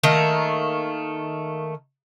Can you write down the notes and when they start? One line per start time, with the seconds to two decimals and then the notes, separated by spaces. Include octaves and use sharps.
0.03 D#3 A3 A#3